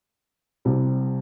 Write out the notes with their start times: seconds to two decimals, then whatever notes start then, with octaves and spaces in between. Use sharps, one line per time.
0.65 C2 C3 G3